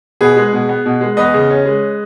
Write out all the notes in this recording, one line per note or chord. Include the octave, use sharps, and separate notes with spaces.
B2 G#4 B4
G#3
B2
B3
B2
G#3
E2 B4 D#5
C#3
C#4
G#3